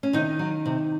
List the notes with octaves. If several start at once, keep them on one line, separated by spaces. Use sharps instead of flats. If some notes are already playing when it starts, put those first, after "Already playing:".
C#4
C3 D#3 D#4
F#3
C3